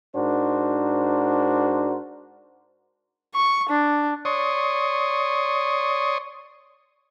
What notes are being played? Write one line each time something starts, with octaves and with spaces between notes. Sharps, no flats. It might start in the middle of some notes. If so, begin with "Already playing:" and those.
G#2 D4 F#4 A#4 C5
C#6
D4
C#5 D5 C6 C#6 D#6